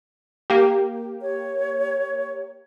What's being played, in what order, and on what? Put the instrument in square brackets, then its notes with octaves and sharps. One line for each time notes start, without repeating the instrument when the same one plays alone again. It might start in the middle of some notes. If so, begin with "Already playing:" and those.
[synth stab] A#3 G4
[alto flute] C#5